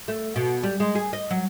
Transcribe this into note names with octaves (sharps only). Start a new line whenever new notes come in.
A3
B2
G3
G#3
G#4
D#5
F#3